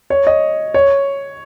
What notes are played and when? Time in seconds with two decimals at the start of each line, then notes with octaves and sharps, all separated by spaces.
0.10 C#5
0.27 D#5
0.74 C#5